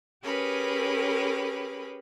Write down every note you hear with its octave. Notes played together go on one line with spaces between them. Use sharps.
C#4 G4 G#4 A#4 B4 B5